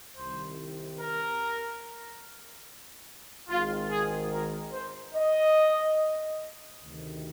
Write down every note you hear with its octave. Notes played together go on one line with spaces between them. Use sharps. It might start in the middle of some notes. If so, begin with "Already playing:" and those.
C2 C3 D#3 C5
A#4
G#1 G#2 D#3 F4
G#4
A#4
C5
D#5
D2 C3 D#3